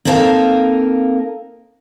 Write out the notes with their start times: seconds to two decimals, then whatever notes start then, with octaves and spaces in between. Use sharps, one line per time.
0.05 A#3 C4 D#4 A4 A#4 F5